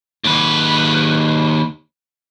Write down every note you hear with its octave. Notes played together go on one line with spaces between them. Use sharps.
D#2 B4